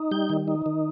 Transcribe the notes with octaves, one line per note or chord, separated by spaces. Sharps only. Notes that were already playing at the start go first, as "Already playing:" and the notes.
Already playing: D#4
G3 G6
D#3
D#4
D#3